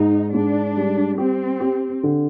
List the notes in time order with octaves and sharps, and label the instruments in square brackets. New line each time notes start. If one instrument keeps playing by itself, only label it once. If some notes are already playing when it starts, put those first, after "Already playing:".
Already playing: [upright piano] G#2 [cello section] D#4
[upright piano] G#2 [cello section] D4
[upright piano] G3
[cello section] C4 [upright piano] G4
[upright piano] G4
D3